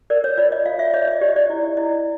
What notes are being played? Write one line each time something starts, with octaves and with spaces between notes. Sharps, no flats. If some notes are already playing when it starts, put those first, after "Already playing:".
A#4 D5
C#5
F4 D5
D#5
F4 F5
E5
C#5 D#5
D#5
G4 D5
D#5
D5
E4
E4 D#5